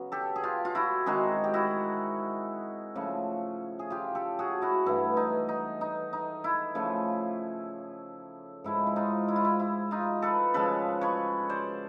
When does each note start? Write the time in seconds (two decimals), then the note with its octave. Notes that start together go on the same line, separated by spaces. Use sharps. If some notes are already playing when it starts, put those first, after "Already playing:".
Already playing: C#3 F#3 B3
0.12 G4 A4
0.36 G#4
0.44 F4 G4
0.65 F4
0.75 E4 F#4
1.06 D#3 G#3 C4 D#4 F#4 G#4
1.44 G4
1.54 E4 F#4
2.96 C#3 F3 A3
3.79 G#4
3.90 F4 G4
4.15 G4 A4
4.39 F#4 G#4
4.62 E4 F#4
4.86 G2 E3 A3 E4
5.17 D#4
5.49 D#4
5.81 D#4
6.13 D#4
6.44 E4
6.75 C#3 F3 A3
8.64 G#2 F3 G#3 E4
8.87 E4
8.96 D#4 F4
9.28 E4
9.36 F4
9.45 E4
9.60 E4
9.91 D#4 F4
10.22 A4 B4
10.54 C#3 F3 G#3 A4 B4
11.01 B4 C#5
11.49 C5 D5